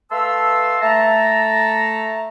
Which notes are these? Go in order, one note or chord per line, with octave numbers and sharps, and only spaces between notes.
A3 B4 F5 A5 C6 E6
A3 E5 A5 A#5